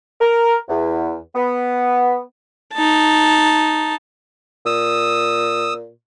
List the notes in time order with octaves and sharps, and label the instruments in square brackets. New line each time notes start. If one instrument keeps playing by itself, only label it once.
[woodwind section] A#4
E2
B3
[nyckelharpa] D#4 A5
[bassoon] A#2 [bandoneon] D#6 E6